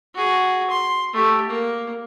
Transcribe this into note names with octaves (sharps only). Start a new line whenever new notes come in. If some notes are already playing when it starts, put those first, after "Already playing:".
F#4 G#4
C6
A3 G4
A#3